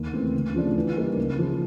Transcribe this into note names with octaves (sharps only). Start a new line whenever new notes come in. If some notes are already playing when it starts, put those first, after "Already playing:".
Already playing: D#2
C#3 E3 A3 C4
D2
C#3 F3 A3 D4
E3
G3 A#3 D#4
C#2
C#3 F3